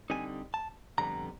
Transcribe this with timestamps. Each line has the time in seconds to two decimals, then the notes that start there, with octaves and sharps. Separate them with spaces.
0.10 D3 G3 C4 D#4 G#5
0.54 A5
0.98 F2 D3 G3 B3 A#5